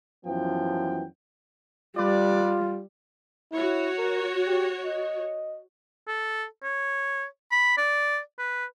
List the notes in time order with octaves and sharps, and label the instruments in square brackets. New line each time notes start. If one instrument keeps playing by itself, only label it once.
[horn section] F#2 E3 F3 B3 G5
[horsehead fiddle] G3 [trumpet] F4 [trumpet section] B4 D5
[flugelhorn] E4 [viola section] F#4 C#5
[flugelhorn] A#4
G4
D#5
[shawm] A4
C#5
B5
D5
B4